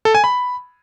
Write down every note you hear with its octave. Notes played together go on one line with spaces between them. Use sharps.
A4
G#5
B5